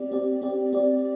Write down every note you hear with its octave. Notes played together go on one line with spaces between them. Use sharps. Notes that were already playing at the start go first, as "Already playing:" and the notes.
Already playing: C4 G4 D5
C4 G4 D5
C4 G4 D5
C4 G4 D5